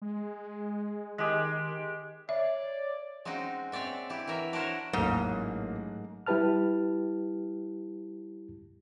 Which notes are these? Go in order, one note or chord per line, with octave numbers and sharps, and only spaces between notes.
G#3
D#3 G#3 G4
C#5 D5 E5
G#3 C4 C#4 D#4 F#4
C4 C#5 D5 E5
E4 G4
E3 F#4 A#4 E5
D4 E4 F#4 A#4 C5 C#5
A1 G#2 F#3 A3 A#3 A4
G3 E4 G4 B4 A5 F6